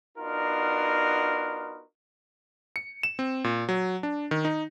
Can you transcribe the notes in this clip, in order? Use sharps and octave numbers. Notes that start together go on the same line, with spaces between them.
B3 D4 D#4 F4 F#4 A#4
C#7
E7
C4
A#2
F#3
D4
D#3
D#4